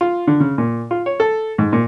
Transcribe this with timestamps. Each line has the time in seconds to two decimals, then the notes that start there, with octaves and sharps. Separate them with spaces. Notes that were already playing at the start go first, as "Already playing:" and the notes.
0.01 F4
0.27 D3
0.40 C#3
0.58 A#2
0.91 F4
1.06 C#5
1.20 A4
1.58 G#2
1.73 A#2